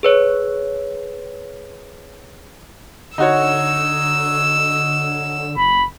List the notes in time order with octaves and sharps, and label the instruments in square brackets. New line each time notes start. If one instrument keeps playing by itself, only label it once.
[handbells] G#4 B4 C#5
[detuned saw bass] D3 [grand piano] D#4 F#4 C#5 [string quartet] E6
[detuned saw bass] F#1 [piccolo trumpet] B5